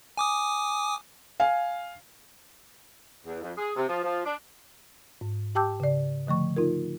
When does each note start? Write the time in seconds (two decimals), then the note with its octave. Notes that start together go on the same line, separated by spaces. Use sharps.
0.17 G#5 D6 D#6
1.40 F5 G#5
3.25 E2
3.42 F2
3.57 G#4
3.76 C3
3.88 F3
4.03 F3
4.24 D4
5.21 G#2
5.55 G4 G5 A5 D6 E6 G6
5.80 C#3 D5
6.27 D3 F3 A3 C#6
6.57 D#4 F4 A#4